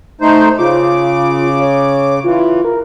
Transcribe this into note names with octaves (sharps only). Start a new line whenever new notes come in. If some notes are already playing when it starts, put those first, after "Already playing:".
A3 D#4 C5
C#3 F4 D6
C#5
E3 F4
A#4